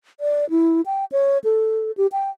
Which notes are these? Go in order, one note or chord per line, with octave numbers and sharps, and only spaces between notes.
D5
E4
G5
C#5
A4
G4
G5